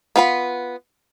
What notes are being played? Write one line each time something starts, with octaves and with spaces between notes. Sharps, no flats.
B3 F4 F#5 B5